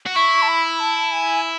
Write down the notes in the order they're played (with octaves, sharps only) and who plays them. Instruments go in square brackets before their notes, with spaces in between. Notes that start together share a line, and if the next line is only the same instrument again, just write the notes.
[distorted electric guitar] F#4
[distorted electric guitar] E4 [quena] C#6
[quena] A5
B5
A5
G#5